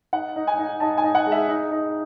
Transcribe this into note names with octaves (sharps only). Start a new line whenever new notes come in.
D#4 F#5
D#4
G#5
D#4
D#4 A5
G#5
D#4
F#5
G#3
E5
D#4
D#4